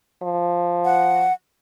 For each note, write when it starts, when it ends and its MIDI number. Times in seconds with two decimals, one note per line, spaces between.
0.23 1.26 53
0.85 1.33 78